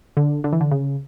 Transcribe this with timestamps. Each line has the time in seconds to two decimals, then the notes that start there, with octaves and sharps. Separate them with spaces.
0.17 D3
0.44 D3
0.53 E3
0.61 D3
0.71 C#3